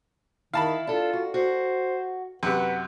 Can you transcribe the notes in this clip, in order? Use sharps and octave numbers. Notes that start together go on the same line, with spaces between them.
D#3 E4 F5 A5 B5
D4 F4 A4
F#4
F#4 C5
F#2 C3 B4 F#5